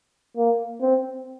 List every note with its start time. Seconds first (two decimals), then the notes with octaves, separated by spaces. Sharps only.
0.37 A#3
0.81 C4